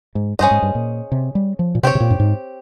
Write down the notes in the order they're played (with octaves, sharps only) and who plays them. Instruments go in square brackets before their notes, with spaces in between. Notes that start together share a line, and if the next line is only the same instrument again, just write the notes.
[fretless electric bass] G#2
[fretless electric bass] G2 [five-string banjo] C#4 G#4 C5 D#5
[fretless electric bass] G#2
G2
A#2
C3
G3
F3
A#2
[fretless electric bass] C3 [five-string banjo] C4 G4 C#5
[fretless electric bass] C3
A#2
G2
G#2